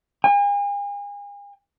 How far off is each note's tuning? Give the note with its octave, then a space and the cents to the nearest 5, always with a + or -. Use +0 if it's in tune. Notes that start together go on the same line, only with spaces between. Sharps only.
G#5 -40